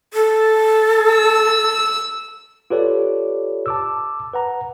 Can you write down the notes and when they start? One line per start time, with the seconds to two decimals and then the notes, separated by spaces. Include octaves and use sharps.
0.14 A4
1.12 E6
2.70 F4 G4 A4 B4 C#5 D5
3.66 A5 D6 E6
4.33 B4 F#5 A#5